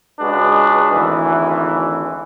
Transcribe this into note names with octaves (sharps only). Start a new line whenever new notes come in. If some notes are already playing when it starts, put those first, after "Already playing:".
C#2 G#3 D4 F#4 B4
G#1 D2 E3